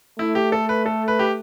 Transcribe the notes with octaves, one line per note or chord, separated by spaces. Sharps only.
A3 E4
G4
A4
B4
A4
B4
G4